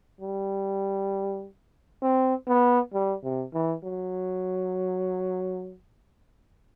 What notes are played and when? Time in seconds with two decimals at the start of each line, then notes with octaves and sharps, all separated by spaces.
0.20 G3
2.02 C4
2.48 B3
2.93 G3
3.23 C3
3.54 E3
3.84 F#3